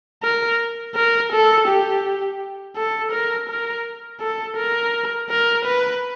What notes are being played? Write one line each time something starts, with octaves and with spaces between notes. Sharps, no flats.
A#4
A#4
A4
G4
A4
A#4
A#4
A4
A#4
A#4
B4